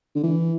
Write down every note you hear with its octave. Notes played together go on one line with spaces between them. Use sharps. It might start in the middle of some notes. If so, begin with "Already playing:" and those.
D3
E3